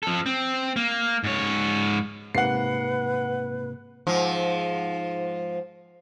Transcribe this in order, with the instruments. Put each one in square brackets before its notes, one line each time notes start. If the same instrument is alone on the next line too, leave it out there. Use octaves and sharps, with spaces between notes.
[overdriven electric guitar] F3 A4
C4
A#3
G#2 C#5
[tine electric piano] G#2 C3 A#3 [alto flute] B4 [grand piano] F#5 C7
[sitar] G#2 F3